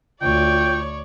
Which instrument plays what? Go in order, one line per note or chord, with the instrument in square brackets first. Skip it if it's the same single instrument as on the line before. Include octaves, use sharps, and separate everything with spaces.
[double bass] D2 [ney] F4 [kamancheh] C#5 D5 [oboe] G5